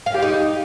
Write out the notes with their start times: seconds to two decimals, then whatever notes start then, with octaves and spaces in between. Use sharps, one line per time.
0.06 F5
0.14 G4
0.22 D#4